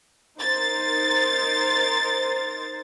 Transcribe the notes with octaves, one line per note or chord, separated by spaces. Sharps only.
D#4 A#4 C5 A6